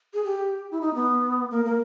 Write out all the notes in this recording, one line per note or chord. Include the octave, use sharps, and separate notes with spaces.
G#4
G4
E4
D#4
B3
A#3
A#3